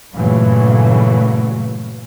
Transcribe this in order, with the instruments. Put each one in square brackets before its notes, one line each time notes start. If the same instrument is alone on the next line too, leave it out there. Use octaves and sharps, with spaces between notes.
[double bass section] G2 A#2 C#3 E3 F#3 A3